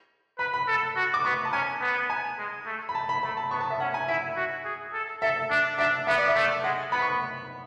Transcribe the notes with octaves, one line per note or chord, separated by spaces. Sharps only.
B4 B5
B5
A4
F#4
D6
B3 C#6
A5
C#4 G#5
B3
G#5
G#3
A3
B5
A5
B5
A3 B5
A5
B3 C#6
A5
E5
C#4 F#5
G#5
E4 E5
F#4
G#4
A4
A4 E5
D4
D4 E5
B3 E5
D5
E5
A3
G#3 F#5
B3 B5
C#6